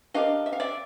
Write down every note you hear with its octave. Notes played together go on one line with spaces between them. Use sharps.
D4 G4 A#4 D#5 F5
E5
F5
D5 E5